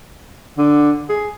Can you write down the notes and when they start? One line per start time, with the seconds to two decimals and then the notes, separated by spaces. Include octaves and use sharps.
0.58 D3
1.09 G#4